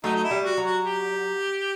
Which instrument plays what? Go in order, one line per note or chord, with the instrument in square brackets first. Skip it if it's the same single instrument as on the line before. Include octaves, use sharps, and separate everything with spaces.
[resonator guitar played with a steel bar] F#3 A3 [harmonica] D#4
[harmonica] D#4
E4
[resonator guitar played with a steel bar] G3
[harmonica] F#4
[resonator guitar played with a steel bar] F#3
[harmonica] F#4
G4